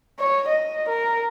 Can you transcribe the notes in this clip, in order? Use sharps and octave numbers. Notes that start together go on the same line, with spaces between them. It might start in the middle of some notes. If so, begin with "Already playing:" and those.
C#5
D#5
A#4